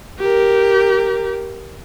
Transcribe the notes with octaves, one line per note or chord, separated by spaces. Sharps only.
G4 A#4